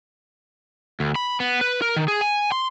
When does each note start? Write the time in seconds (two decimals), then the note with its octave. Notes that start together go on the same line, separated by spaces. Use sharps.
1.00 D2
1.15 B5
1.40 B3
1.61 B4
1.82 A#4
1.96 D#3
2.08 G#4
2.21 G#5
2.52 C6